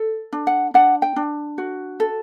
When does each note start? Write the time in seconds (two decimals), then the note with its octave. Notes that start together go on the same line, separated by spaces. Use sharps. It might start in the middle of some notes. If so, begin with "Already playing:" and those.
Already playing: A4
0.33 D4
0.47 F#5
0.74 D4 F#5
1.02 G5
1.16 D4
1.58 F#4
2.00 A4